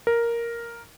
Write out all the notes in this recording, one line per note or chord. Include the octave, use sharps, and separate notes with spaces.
A#4